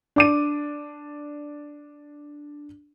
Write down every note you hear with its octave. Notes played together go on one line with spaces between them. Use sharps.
D4 D6 D#7